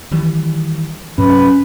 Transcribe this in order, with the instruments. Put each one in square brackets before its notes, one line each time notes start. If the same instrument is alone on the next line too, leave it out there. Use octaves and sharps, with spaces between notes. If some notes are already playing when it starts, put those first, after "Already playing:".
[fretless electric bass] D#3 E3 G3
[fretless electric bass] G2 C3 F#3 [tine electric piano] C#4 [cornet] B4